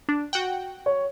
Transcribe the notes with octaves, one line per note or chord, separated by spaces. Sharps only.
D4
F#4 F#5 G5
C#5